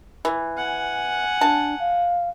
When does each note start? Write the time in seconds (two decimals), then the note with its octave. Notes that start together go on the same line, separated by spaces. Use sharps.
0.25 E3
0.57 F#5 G#5
1.41 D4 A5
1.79 F5